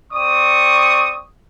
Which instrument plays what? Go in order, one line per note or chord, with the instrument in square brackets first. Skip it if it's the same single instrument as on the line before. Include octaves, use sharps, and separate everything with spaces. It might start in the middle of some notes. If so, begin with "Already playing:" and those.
[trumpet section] C4 D5 C#6 D#6